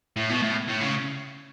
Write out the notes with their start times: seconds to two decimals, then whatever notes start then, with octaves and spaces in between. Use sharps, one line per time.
0.17 A2
0.30 B2
0.43 A2
0.68 A2
0.81 C#3